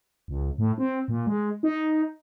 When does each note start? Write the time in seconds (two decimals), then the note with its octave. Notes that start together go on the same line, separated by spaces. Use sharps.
0.28 C#2
0.58 A2
0.78 C4
1.08 A#2
1.27 G#3
1.63 D#4